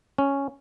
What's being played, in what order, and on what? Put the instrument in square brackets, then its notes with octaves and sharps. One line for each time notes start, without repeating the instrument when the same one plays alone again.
[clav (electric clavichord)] C#4